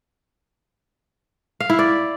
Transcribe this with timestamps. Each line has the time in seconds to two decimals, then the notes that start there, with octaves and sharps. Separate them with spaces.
1.60 F5
1.70 E4
1.79 D5